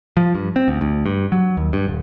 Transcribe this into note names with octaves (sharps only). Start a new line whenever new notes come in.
F3
G2
C4
D2
D2
G2
F#3
D#2
G2
D#1